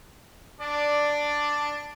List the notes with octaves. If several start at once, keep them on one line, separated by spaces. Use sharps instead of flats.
D4 D5